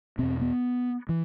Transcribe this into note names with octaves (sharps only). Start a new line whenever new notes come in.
E2 B2 C4
B3
E3